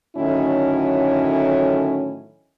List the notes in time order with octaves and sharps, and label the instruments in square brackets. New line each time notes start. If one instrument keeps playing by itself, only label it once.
[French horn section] A2 D3 D#3 F#3 C#4 E4